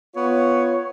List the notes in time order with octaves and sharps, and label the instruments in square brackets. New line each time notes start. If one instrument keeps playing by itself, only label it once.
[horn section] B3 F4 C#5